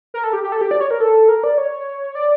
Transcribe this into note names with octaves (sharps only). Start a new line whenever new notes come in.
A#4
A4
G4
G4
A4
G4
D5
C#5
A#4
A4
A#4
D5
C#5
D5